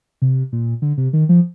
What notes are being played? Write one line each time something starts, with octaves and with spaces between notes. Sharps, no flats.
C3
A#2
D3
C3
D#3
F3